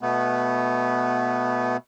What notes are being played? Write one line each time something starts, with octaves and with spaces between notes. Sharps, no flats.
B2 A3 B3